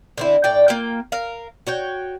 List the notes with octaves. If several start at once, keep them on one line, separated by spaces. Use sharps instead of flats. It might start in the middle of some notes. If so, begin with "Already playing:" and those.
D3 C4 E4
A2 D5 G5
A#3 F4 G5
A#4 F5
F#4 C#5 G5